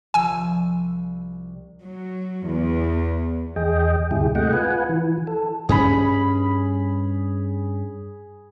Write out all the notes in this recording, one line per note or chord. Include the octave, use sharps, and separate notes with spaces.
C2 F3 G#5 E6
F#3
E2
E2 G#4 D#5 G5
D2 G2 C3 E4 G4 G#4
C3 G#3 A3 D#5 F#5 G5
F4 B4 F#5 G#5
E3
A4
G2 C4 C#4 G#4 B5